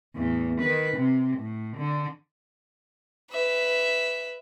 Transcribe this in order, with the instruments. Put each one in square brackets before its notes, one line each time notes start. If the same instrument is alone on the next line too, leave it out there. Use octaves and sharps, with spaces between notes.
[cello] E2 A2
D#3 B4
C3
A2
D3
[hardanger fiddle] B4 E5